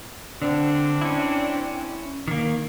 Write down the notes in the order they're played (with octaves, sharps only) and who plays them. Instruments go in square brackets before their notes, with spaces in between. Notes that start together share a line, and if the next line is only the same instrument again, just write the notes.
[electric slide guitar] D3 [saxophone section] C4 D4
[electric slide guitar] C#4 E4
D#3 A#3